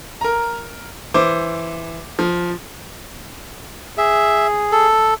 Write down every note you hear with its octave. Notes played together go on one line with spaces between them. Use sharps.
A#4 A#5
E3 C5 D6
F3
G#4 E5
A4